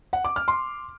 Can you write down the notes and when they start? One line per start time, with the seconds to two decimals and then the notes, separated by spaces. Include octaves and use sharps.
0.13 F#5
0.25 D6
0.36 F6
0.48 C6